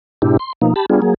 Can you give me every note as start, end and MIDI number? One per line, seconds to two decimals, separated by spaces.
0.22 0.37 44
0.22 0.37 47
0.22 0.37 62
0.22 0.37 64
0.22 0.37 67
0.39 0.53 84
0.62 0.74 47
0.62 0.74 53
0.62 0.74 58
0.62 0.74 63
0.76 0.86 67
0.76 0.86 81
0.76 0.86 83
0.90 1.01 55
0.90 1.01 59
0.90 1.01 62
0.90 1.01 65
0.90 1.01 68
1.02 1.14 54
1.02 1.14 58
1.02 1.14 68